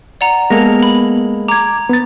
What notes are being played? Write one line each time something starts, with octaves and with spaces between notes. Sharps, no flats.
D5 F#5 A#5
G#3 A#3 B3 A4 A#6 F7
B5
A#5 D6 G#6
B3 A6